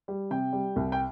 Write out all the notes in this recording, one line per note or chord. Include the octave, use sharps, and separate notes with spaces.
G3
C3 G5
G3
C2
G5